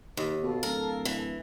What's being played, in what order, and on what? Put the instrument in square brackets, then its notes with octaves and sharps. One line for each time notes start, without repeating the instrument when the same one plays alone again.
[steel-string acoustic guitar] D#2 [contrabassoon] D#3
[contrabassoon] B2 [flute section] A4 F5
[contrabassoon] D1 [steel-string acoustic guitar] A#4
[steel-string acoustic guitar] E3